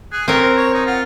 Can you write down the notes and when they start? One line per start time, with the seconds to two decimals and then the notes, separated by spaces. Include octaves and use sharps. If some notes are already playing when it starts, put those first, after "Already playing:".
0.12 G#4 F#6
0.28 C4 C#4 A#4
0.42 C5 A#5
0.57 C#5
0.74 D#4
0.87 F4 F#5